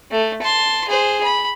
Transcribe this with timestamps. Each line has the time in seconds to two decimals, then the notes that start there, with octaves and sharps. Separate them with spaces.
0.11 A3
0.42 A5 C6
0.88 G#4 C5
1.23 B5